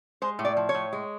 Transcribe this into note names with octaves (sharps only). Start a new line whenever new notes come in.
G#3 C5
A2
D5
F3
C#5
A2
G#3